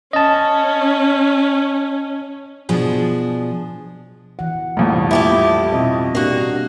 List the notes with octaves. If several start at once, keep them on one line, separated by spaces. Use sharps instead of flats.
C#4 D#5 A5
B2 F3 D4 G#4
E3 F#5
A#1 F2 A2 G3
E4 G4 A4
B2 C4 D#5
A#3 D4 F#4 G4